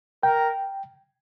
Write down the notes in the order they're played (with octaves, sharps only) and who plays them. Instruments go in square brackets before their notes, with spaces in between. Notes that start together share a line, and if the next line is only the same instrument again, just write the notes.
[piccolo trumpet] A#4 [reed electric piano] G5